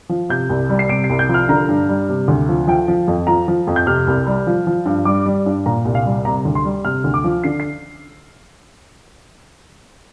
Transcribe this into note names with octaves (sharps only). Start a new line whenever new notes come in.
F3
C3 G6
C2
G3
C7
C3 D7
C7
C2
G6
F3
F6
D3 A#5
G2
G3
C3
D2
F3
F3 G5
F3
F2
F3 A#5
F3
F2
G6
C3 F6
C2
G3
F3
F3
G2
G3 D6
G3
G2
A#2 A#5
C2
F5
G3
C3 A#5
D2
C6
G3
C3 F6
D2
D6
F3
D3 C7
C7